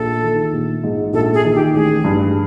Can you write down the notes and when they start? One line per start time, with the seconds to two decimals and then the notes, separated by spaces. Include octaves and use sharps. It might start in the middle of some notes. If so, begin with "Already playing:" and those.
Already playing: A#1 A4
0.23 D#3
0.53 A#1
0.83 G#2
1.13 A#1 A4
1.34 G#4
1.45 D#3
1.54 G4
1.74 A1 G#4
2.04 G2